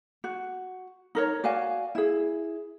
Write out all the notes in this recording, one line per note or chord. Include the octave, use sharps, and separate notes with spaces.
F#4
D#4 A#4 C#5
F#4 D5 F5 G#5
E4 G#4